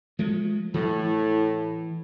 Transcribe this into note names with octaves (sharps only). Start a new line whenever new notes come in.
F3 G#3 A3
A2 E3